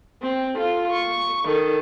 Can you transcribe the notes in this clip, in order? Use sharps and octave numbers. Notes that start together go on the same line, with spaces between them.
C4
F4 A4
C#6
D#3 A4